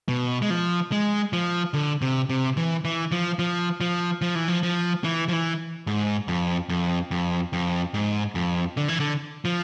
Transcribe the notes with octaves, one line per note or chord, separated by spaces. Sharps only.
B2
G#3
F3
G#3
F3
D3
C3
C3
E3
E3
F3
F3
F3
F3
E3
F3
F3
E3
F3
E3
G#2
F2
F2
F2
F2
G#2
F2
D3
E3
D3
F3